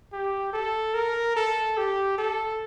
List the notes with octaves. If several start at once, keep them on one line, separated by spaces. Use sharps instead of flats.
G4
A4
A#4
A4
G4
A4